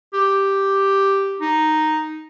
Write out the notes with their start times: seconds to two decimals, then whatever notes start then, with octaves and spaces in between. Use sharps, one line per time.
0.14 G4
1.41 D#4